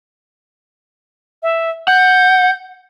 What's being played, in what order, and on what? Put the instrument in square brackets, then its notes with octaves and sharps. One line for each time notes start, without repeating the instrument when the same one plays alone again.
[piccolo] E5
[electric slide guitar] F#5 [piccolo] G6